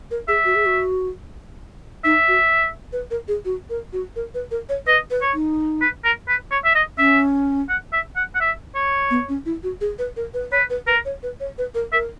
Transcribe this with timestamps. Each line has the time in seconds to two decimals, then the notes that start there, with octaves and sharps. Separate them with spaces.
0.11 A#4
0.28 G#4 E5
0.45 F#4
0.55 G#4
0.66 F#4
2.04 D#4 E5
2.28 F#4
2.93 B4
3.11 A#4
3.28 G#4
3.45 F#4
3.70 A#4
3.93 F#4
4.16 A#4
4.34 B4
4.51 A#4
4.69 C#5
4.86 B4 D#5
5.11 B4
5.22 C#5
5.34 D#4
5.81 B4
6.04 A#4
6.28 B4
6.51 C#5
6.64 E5
6.75 D#5
6.98 C#4 E5
7.69 F#5
7.93 E5
8.16 F#5
8.35 F#5
8.40 E5
8.75 C#5
9.10 B3
9.29 C#4
9.46 E4
9.63 F#4
9.81 G#4
9.99 B4
10.16 A#4
10.34 B4
10.51 B4 C#5
10.70 B4
10.87 A#4 B4
11.05 C#5
11.23 B4
11.40 C#5
11.58 B4
11.75 A#4
11.92 A#4 E5